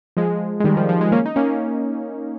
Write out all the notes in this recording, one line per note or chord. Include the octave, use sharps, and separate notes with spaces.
F3 G#3
G#3
D#3 G3
F3
F3
F3 G#3
A#3 C#4
D#4
A#3 C#4